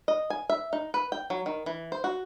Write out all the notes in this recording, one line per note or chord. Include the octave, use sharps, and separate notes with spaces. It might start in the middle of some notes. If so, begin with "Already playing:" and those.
D#5
G#5
E5
D#4
B4
G5
F#3
D#3
E3
C5
F#4